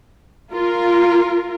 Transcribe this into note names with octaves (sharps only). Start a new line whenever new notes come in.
F4 A#4